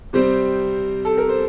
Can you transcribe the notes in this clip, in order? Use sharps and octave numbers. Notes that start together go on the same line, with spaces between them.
C3 G3 C4 C5
A4
A#4
C5